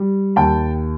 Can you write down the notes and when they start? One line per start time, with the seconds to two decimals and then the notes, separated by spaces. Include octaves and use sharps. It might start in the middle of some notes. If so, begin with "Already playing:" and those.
Already playing: G3
0.36 D#2 G5 A5